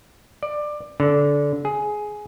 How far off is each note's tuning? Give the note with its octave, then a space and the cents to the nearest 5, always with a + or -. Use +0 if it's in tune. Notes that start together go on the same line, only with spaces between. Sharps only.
D5 +20
D3 -20
G#4 +10